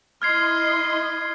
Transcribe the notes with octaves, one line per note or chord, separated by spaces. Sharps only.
E4 D#5 C6 F6 G#6 C7